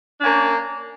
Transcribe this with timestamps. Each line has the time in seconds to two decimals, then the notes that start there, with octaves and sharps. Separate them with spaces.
0.20 D4
0.23 C#4
0.26 A#3